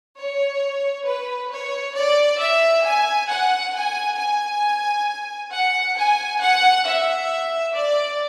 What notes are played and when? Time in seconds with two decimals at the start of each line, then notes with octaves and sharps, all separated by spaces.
0.17 C#5
1.06 B4
1.51 C#5
1.96 D5
2.41 E5
2.85 G#5
3.30 F#5
3.73 G#5
4.18 G#5
5.51 F#5
5.97 G#5
6.41 F#5
6.85 E5
7.75 D5